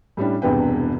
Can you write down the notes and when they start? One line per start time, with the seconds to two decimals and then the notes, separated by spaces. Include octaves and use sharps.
0.17 A2 G3 C#4 D4
0.42 E1 E2 G2 C3 B4 G5